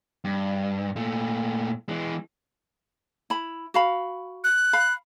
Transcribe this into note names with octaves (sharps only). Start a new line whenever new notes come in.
G2
A#2 A3
E3 G#3
E4 B5
F#4 F5 B5
F#6
F5 B5